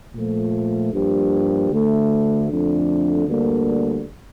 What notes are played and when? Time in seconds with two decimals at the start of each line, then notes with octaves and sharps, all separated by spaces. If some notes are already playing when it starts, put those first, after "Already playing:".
0.15 A#2 F3 A3
0.93 G2 F3 A#3 D4 G4
1.71 D2 D3 A3
2.50 F2 D3 A3 D4
3.28 D2 D3 G3 A#3